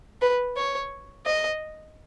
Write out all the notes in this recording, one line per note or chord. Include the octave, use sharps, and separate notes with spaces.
B4
C#5
D#5